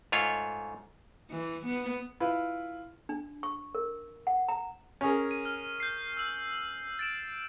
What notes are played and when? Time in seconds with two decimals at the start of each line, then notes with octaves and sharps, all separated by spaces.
0.12 G#2 A3 F4 C#5
1.31 E3
1.66 B3
2.20 E4 F4 B4
3.09 D4
3.43 C#6
3.75 A#4
4.27 F#5
4.48 A#5
5.01 C#4 G#4 A#4
5.31 D#7
5.45 F6
5.80 G6 C7
6.17 E6 F#7
6.99 A6 D7 E7